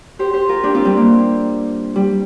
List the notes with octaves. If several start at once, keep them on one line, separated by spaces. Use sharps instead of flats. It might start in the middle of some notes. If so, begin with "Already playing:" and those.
G4 C5
G4 C5
F4 A#4
D4 G4
C4 F4
G3 C4
A#3
G3